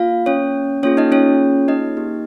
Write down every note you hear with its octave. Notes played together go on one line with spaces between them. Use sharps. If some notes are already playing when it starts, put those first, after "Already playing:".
Already playing: A#3 F4 F5
C#4 C#5
A#3 C#4 F4 G#4 C#5
D#4 D#5
C#4 C#5
D#4 D#5
A#3 D#4 G4